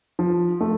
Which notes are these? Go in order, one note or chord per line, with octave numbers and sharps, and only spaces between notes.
F3
A3